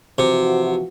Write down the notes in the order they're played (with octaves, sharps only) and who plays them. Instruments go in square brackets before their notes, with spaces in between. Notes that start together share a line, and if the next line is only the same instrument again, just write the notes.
[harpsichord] C3 [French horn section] E3 F3 F#4